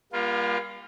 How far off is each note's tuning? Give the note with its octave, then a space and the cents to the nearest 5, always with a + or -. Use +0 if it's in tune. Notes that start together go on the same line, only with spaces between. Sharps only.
G3 +40 A#3 +45 F4 +0